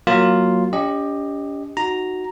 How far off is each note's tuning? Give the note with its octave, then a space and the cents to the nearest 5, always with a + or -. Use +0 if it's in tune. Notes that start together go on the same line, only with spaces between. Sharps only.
F#3 +0 A#3 +0 F4 +0
C#4 +45 G4 +15 D#5 +0
D#4 +0 F#4 +0 A#5 +0